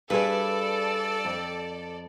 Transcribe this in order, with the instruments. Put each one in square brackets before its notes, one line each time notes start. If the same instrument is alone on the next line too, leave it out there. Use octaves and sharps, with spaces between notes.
[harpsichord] G2 [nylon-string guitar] G#4 B4 [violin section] A4 D5 [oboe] E6
[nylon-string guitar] F2